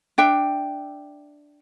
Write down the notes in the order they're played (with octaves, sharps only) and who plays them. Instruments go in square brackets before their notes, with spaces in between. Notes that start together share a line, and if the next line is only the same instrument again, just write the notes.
[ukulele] D4 E5 G5